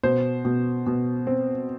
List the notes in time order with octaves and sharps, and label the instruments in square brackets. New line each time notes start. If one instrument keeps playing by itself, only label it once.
[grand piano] B2 C5
B2
B2
C4